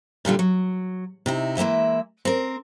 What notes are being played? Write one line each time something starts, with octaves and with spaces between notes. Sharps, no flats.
A#2 D3 G3 F4
F#3
C3 D#4 E4
E3 G#3 A#3 E4 E5
C4 A#4